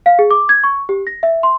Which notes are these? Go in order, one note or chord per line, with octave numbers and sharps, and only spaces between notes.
F5
G#4
D6
G#6
C#6
G4
A#6
E5
C6